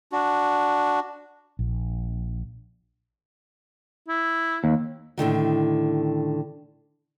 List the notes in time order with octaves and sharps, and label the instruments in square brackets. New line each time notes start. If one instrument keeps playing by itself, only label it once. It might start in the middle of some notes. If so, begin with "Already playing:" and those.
[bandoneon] D4 F#4
[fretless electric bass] A#1
[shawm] E4
[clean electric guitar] D#2
[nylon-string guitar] A2 D3 D#3 F#3